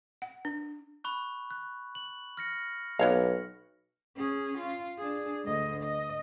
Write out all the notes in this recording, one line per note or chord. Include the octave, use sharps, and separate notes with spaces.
F#5
D4
B5 C#6 F#6
F#6
F#7
F6 A#6 C#7
B1 B3 C#5 F5
C#4 G#4
F4
D4 G#4
D2 D#5
D#5